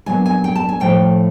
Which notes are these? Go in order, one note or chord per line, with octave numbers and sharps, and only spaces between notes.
A#2 F#3 B3 D4 G#5
G#5
G5
A5
G#5
A2 F3 A3 G5